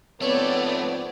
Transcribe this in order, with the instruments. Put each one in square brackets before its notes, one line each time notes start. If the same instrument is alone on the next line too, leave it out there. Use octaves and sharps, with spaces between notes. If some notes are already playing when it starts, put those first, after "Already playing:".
[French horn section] G#2 F3 C4 [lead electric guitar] A3 [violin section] B3 D5 [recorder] C#5